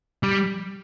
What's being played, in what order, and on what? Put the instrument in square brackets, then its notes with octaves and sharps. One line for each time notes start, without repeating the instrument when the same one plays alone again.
[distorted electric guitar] G3